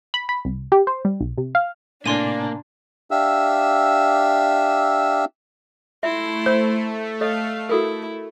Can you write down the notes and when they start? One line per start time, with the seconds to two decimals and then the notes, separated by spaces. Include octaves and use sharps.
0.14 B5
0.29 B5
0.45 C2
0.72 G4
0.87 C5
1.05 G3
1.21 B1
1.38 C3
1.55 F5
2.06 A2 C3 A#3 D4 D5 G#5 C6 D#7
3.11 D4 G4 E5 F5 E6
6.03 A3 E4 E5 C6
6.46 C5
7.21 A4 C#5 D#5 F5
7.69 E4 F#4 A4 A#4